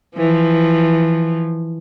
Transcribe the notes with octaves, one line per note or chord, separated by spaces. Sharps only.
E3 F3